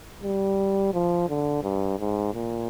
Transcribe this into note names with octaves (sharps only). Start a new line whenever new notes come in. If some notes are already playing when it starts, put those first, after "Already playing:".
G3
F3
D3
G2
G#2
A#2